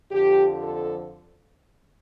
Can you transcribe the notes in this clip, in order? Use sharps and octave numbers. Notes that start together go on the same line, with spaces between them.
F2 D3 F3 G4
A4